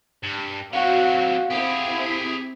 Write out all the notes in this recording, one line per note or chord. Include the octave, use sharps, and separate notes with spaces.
G2
F#3 C4 F#4 F5 F#5
C4 E4 G4 G#4
B6